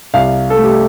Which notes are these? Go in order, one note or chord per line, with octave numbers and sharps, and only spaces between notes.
C2 F5
A4
A3
G4